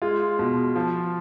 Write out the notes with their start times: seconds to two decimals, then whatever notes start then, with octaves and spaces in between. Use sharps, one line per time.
0.02 G#3 F4
0.39 B2
0.76 F3